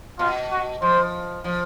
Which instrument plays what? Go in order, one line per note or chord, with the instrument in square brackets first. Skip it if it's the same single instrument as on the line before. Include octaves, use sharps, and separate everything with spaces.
[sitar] B2 [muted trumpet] F4
[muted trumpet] F#4
[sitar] F3 [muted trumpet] C5
[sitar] F3